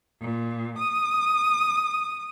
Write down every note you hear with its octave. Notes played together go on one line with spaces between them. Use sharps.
A#2
D#6